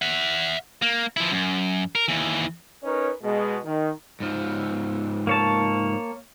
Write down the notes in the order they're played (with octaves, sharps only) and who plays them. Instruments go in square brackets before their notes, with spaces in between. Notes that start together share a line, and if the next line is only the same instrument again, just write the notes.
[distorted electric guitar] E5 F#5
A#3
F3 E4
F#2
A#4
D#2 E3
[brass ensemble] C#4 D#4 A#4 B4 C#5
B2 G#3
D#3
[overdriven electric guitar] G#2 F3
[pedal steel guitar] A#3 C#5 A5